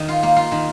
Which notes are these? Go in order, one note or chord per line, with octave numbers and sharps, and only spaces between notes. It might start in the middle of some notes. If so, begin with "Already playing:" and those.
Already playing: D#3
F4
A#3
F4
D#3